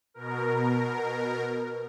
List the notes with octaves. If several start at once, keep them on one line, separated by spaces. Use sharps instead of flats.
B2 A#4